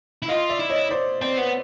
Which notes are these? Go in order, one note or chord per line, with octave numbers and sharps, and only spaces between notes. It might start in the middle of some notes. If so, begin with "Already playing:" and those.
E4
F4 D#5 F5
D5 E5
E4
C#5 D#5
C5 D5
C4 C5 D5
B3